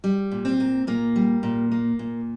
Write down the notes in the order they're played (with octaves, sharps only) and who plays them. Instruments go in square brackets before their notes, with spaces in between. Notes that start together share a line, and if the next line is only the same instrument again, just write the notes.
[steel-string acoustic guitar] G3
A#2
C4
A#3
A#2 A#3
G3
A#2
A#3
A#2